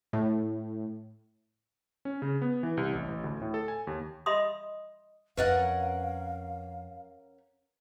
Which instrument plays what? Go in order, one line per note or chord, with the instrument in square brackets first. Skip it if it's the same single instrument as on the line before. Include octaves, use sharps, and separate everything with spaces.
[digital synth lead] A2
[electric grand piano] C#4
C#3
B3
E3
C2
A1
A1
D2
A2
A4
G#5
D#2
[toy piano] D#5 E5 B5 C6 D#6
[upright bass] F2 [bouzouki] C#4 A#4 F#5 [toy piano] B4 D#5 [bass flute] F5